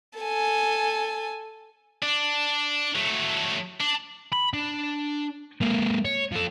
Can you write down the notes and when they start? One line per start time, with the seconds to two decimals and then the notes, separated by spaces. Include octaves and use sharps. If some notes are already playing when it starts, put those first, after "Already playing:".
0.19 A4 G#5
2.03 D4
2.95 F#3 A3
3.80 D4
4.32 B5
4.53 D4
5.61 G#3 A#3
6.05 C#5
6.32 F3 A4